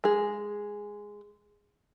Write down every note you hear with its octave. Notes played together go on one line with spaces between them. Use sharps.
G#3 G#4